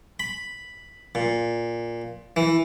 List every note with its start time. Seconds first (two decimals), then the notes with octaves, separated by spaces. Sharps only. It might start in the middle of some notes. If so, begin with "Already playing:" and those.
0.20 B5
1.15 A#2
2.36 E3